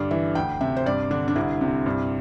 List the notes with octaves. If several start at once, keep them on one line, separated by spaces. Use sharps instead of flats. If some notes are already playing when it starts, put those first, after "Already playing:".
Already playing: G2 D3 D5
E3 E5
D2 G5
C3 E5
C5
G2 D5
D3 D4
D4
C2 E4
C3
G2